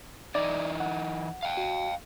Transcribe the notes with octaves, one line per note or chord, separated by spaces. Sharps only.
E3 D#4 E4 D5
F#5
F5 G5
F#4